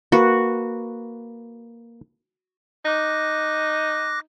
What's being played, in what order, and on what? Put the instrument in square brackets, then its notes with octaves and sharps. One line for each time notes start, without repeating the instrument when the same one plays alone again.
[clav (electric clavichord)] A#3 B4 [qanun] F#4
[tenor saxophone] D#4 [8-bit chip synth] D6 F#6 A#6